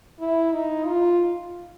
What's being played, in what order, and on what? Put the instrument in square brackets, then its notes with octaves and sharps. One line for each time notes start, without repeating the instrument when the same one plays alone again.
[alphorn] E4
D#4
F4